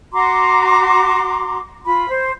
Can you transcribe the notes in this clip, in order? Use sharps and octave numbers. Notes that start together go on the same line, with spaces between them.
F#4 A#5 C6 D6
F4 B5
C5